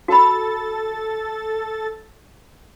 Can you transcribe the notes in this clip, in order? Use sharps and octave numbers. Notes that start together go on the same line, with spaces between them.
F#4 A4 B5 A6